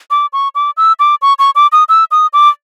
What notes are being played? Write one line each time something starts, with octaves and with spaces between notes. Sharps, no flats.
D6
C#6
D6
E6
D6
C#6
C#6
D6
D#6
E6
D#6
D6